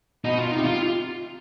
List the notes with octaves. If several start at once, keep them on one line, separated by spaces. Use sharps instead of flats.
B2 D#4
F4
C3 D#4
F4